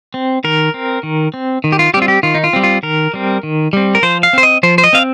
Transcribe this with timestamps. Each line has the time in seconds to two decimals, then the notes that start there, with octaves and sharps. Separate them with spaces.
0.14 C4
0.44 D#3 A#4
0.74 C4
1.03 D#3
1.34 C4
1.64 D#3
1.72 G4
1.79 F4
1.94 G3 G4
1.97 C4 F4
2.08 G4
2.23 D#3 F4
2.35 D#4
2.44 F4
2.53 G3 C4
2.63 F4
2.83 D#3 A#4
3.14 G3 C4
3.43 D#3
3.73 G3 C4
3.95 A#4
4.03 F3 C5
4.23 F5
4.33 C4 C5
4.43 D#5
4.63 F3 C5
4.78 C5
4.84 D#5
4.93 C4 F5